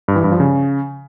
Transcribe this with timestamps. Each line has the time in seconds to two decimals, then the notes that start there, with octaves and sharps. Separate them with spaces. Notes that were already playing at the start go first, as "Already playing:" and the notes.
0.08 G2
0.16 E3
0.24 G2
0.32 F3
0.40 C#3